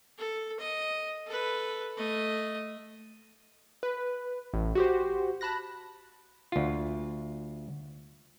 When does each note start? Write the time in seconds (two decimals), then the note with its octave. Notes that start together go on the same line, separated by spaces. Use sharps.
0.18 A4
0.59 D#5
1.27 A4 B4
1.97 A3 D#5
3.83 B4
4.54 A1
4.75 F#4 G4 C5
5.41 A5 B5 F#6 A#6
6.52 D2 F4